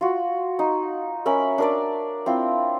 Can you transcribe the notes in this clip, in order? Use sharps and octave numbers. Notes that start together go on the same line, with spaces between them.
F4 F#4
D#4
C#4 A#4 E5 B5
D4 A#4 D5
C4 E4 F4